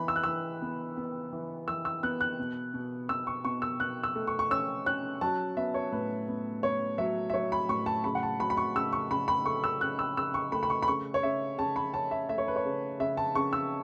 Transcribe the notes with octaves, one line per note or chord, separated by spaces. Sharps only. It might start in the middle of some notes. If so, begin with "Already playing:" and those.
Already playing: E3 B3 B5
E6
F#6
E3 E6
B3
B3
E3
E3 E6
E6
B3 F#6
F#6
B2
B2
B2 E6
C#6
B2 C#6
E6
B2 F#6
E6
A3
C#6
C#6
C#4 E6
C#4 F#6
F#3 A5
B3 E5
C#5
A2 B4
B3
B3 C#5
F#3 E5
E5
F#3 C#5
B5
A2 C#6
A5
C#3 B5
F#5
A5
F#3 B5
B5
C#6
C#3 E6
C#6
C#3 B5
B5
A3 C#6
E6
C#3 F#6
E6
C#3 E6
C#6
A3 B5
B5
C#6
B5
C#3 C#6
C#5
C#3 E5
C#3 A5
B5
C#4 A5
E5
A3 E5
C#5
B4
C#5
C#3
C#3 E5
A5
C#3 C#6
E6